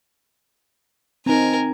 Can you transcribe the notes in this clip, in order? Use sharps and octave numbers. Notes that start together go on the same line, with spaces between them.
C4 D#4 A#4 G#5